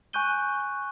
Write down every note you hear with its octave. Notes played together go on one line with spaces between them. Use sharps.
G#5 C#6 F#6 G6 D#7 G7